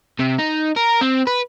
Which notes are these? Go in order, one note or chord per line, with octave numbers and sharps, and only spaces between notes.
C3
D#4
A#4
C4
B4